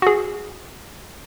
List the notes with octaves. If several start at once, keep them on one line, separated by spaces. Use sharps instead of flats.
F#4 G#4